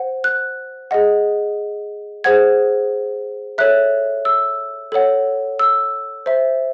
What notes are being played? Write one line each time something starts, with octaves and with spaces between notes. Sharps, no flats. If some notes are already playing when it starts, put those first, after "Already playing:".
Already playing: C5 F#5
F#6
G#4 D#5 F#5
G#4 C5 F#5 G#6
A4 C#5 E5 F#6
E6
A4 C#5 F#5
E6
C5 E5